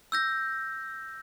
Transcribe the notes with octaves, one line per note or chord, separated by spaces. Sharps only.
E6 G6 A#6